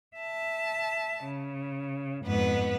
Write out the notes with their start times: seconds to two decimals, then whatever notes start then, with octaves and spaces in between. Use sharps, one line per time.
0.16 E5 A5
1.24 C#3
2.24 F2 G#2 B3 B4